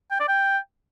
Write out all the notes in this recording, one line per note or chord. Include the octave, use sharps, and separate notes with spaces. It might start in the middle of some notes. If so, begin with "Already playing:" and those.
G5
D5
G5